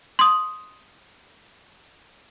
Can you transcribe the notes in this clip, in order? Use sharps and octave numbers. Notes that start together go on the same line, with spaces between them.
C6 D#6